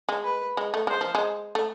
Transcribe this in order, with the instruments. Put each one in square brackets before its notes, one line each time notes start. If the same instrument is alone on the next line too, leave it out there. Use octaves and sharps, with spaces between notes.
[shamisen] G#3
[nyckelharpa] B4
[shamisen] G#3
A3
[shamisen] G#3 [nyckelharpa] C5
[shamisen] F3
G#3
A3